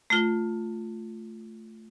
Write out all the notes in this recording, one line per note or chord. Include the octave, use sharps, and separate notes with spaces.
A3 F4